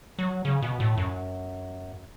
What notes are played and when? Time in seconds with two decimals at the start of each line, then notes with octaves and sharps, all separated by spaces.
0.19 F#3
0.45 C#3
0.62 B2
0.80 A2
0.97 F#2